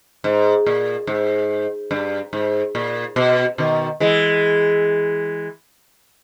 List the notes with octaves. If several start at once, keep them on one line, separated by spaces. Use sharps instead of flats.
G#2
A#2
G#2
G2
G#2
A#2
B2
B2 D#3
E3 G#3